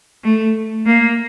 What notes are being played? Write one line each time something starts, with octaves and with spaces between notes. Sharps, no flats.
A3
A#3